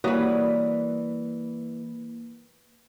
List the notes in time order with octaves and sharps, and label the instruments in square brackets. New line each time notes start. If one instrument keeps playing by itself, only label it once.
[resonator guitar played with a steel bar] E3 [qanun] G3 B4 [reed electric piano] A#3 [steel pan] F#4 C#5 D#6